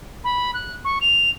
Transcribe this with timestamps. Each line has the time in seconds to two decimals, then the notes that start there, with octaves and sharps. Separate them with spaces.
0.24 B5
0.54 F#6
0.84 C#6
1.01 F7